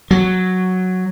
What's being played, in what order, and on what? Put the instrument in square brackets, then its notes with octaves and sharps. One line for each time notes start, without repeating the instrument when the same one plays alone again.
[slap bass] F#3